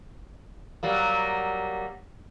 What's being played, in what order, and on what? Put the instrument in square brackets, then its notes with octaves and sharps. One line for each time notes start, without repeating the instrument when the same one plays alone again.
[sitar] F#3 G3 A#3